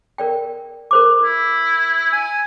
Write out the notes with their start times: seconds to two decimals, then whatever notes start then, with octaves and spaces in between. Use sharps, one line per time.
0.18 A#4 D5 G5
0.91 A#4 C5 D6
1.23 E4
2.12 G#5